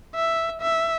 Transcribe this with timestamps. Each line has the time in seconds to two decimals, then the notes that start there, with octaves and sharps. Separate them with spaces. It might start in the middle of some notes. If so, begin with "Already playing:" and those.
0.15 E5
0.62 E5